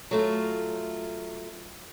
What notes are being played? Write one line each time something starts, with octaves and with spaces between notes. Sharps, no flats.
F#3 A3 F4